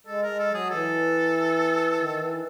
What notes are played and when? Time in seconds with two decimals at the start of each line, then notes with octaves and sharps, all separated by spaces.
0.07 G#3 A4
0.23 G#3 A#4
0.39 A4
0.50 F#3 G#4
0.70 E3 A4
1.97 D#3
2.18 E3